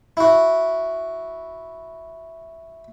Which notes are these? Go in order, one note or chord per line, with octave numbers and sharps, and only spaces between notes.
E4 F#4